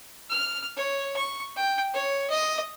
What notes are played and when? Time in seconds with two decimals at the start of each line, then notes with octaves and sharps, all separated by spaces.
0.30 F6
0.77 C#5
1.17 C#6
1.56 G5
1.94 C#5
2.30 D#5